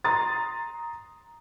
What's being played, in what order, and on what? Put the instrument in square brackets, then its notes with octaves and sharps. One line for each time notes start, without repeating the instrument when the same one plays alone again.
[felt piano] A#5 C6 D#6 A6